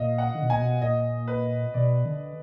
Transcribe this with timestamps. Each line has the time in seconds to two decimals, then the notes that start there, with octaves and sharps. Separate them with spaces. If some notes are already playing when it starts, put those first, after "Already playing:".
Already playing: A#2 D#5 F5
0.18 F#5
0.34 D3
0.42 B2
0.50 A#2 G#5
0.60 B2
0.81 A#2 D#5
1.28 B4
1.74 B2 D5
2.05 D3